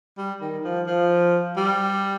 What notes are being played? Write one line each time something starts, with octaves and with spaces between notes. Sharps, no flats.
G3
D#3
F3
F3
G3